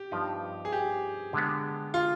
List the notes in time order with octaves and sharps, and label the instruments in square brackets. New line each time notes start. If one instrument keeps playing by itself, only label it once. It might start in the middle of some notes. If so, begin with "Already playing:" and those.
Already playing: [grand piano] G4
[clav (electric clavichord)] G2 F3 B3 D#4 B4
[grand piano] G#4
G4
[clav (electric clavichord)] D3 G#3 B3
[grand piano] F4